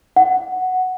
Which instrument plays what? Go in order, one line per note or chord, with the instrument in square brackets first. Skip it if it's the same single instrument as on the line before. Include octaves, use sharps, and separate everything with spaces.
[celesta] F#5